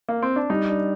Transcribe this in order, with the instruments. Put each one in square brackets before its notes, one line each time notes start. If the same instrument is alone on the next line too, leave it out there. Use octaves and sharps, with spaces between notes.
[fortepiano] A#3
C4
D4
[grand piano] G3 [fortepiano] D#4
[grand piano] D4